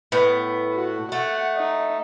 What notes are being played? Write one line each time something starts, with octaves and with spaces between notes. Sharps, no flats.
A2 B3
F#4
A3 F#5
D#4